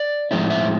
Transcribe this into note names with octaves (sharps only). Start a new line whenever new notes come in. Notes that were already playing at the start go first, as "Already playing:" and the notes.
Already playing: D5
A2 F3 G#3 C4 E4 D5
E5